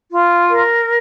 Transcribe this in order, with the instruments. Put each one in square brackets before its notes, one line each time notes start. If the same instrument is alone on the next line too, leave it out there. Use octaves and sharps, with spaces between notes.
[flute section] F4
A#4